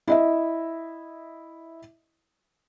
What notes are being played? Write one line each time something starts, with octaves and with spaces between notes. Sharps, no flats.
E4 D#5 E5